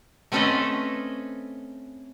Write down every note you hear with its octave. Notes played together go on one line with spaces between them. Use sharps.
A3 C4 C#4 A4 B4 D#5